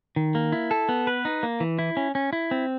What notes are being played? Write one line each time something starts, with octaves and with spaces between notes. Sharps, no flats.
D#3
A#3
E4
A4
B3
B4
D#4
A#3
E3
E4
C#4
C#4
E4
C4